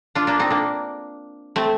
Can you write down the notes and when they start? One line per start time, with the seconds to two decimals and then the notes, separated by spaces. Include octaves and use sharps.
0.15 D4 F4
0.27 A#3 D4
0.39 C4 D#4
0.50 A#3 D4
1.56 A3 C4